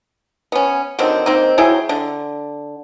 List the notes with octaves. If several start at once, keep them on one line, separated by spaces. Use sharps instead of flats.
B3 C#4
D3 D#3 F#3 C4
D#3 A#3 C4
F#3 E4 G#4 G5
D3